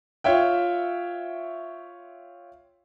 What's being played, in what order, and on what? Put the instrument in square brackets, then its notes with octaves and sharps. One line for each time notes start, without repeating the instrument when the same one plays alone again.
[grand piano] F4 C#5 E5 G5